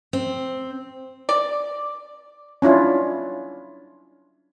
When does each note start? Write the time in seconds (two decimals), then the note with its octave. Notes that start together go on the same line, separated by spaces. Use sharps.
0.13 C4
1.29 D5
2.62 C#4 D4 E4 F4